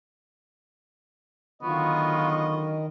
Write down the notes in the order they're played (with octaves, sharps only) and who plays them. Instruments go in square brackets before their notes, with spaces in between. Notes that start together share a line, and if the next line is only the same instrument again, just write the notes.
[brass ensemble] D3 F#3 D#5 [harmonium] D#3 [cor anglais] B3 [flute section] F4 C#6